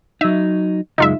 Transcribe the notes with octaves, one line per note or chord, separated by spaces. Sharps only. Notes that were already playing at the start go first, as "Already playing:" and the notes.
F#3 D#4 E5
C#2 F#2 G#3 D#4 F4 E5